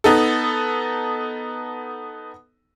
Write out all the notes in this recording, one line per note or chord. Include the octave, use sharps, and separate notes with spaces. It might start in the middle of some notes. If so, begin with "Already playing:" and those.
B3 D#4 A4